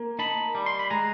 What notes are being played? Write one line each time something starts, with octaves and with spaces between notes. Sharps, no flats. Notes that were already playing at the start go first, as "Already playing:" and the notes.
Already playing: A#3
D#4 A5 B5
G3
C6
B5
G#3 G#5 A#5